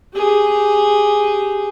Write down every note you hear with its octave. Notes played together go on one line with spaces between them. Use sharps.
G4 G#4